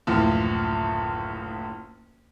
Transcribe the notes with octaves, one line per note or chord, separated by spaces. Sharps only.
F#1 D2 A2 E3 F3